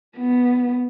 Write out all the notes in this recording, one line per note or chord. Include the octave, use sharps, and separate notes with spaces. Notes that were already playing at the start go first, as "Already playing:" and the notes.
B3